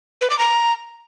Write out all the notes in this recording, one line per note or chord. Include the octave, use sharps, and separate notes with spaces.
B4
D6
A#5